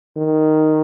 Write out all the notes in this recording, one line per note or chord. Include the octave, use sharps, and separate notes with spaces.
D#3